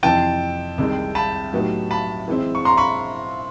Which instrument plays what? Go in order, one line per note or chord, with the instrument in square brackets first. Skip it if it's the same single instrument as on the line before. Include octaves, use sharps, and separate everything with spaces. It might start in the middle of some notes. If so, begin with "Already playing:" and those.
[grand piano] F2 C3 E3 [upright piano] G5 A5
[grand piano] C2 C3 D#3 G#3
[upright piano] A5 B5
[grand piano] A2 F#3 B3 D#4 G4
[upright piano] A5 B5
[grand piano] E3 G#3 C4 E4
[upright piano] C#6
A#5 C6
B5 C#6